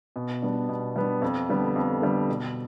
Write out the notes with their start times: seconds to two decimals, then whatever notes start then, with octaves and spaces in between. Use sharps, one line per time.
0.16 B2
0.42 G3 B3 D4
0.69 B2
0.96 G3 B3 D4
1.22 F2
1.49 D3 G3 B3
1.76 F2
2.02 D3 G3 B3
2.29 B2